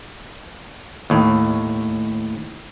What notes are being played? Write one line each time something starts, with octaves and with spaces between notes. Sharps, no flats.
D#2 A2